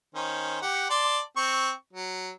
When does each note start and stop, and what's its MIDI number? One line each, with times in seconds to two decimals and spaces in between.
0.15 0.61 51
0.15 0.61 61
0.15 0.61 72
0.62 0.87 67
0.62 0.87 78
0.90 1.19 74
0.90 1.19 81
0.90 1.19 84
1.36 1.71 60
1.36 1.71 85
1.93 2.30 54